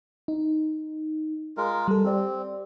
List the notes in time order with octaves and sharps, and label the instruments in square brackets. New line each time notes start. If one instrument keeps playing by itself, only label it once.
[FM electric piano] D#4
[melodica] G#3 F4 A#4
[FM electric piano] G3 A4
[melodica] C4 [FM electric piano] G4 D5